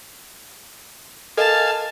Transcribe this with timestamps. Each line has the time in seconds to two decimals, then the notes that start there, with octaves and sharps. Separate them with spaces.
1.37 A4 A#4 D#5 F5 G#5 A5